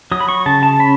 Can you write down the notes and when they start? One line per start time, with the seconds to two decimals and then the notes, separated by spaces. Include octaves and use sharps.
0.12 F#3 D#6
0.20 B5
0.28 C#6
0.46 C#3 A5
0.63 A5
0.79 C#4 B5